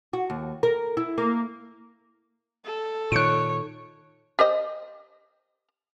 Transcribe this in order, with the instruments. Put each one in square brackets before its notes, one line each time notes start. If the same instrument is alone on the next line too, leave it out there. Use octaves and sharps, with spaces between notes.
[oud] F#4
D#2
A#4
E4
A#3
[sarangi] A4
[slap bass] A#2 D#3 [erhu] C#5 [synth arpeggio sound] F#6 C#7 D7
[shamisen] G4 C5 D#5